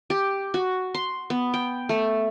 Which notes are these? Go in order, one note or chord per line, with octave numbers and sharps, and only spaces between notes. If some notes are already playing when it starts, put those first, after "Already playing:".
G4
F#4
C6
B3
G5
A3